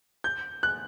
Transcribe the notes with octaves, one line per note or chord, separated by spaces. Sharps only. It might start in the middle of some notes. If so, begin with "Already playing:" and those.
G6
F#6